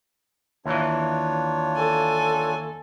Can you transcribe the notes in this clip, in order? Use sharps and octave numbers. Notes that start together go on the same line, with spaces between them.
D#2 E3 D4 F4 C#5
A4 G#5